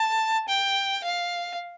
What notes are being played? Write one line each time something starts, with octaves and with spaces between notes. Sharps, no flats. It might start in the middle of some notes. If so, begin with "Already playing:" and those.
Already playing: A5
G5
F5